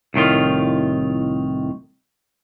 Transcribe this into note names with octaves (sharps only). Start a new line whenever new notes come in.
C2 A2 D#3 F4